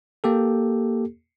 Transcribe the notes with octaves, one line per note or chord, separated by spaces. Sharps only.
A#3 G4 A4